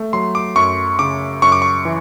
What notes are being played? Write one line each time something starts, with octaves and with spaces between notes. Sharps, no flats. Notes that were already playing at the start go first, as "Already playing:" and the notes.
Already playing: A3
F#3 C6
D6
F#2 C#6
C#3 D6
F#2 C#6
D6
C#6
E3